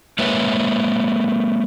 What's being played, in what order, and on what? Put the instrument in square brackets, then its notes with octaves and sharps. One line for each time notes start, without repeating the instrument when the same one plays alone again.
[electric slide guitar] G#3 A#3 B4 C#5 E5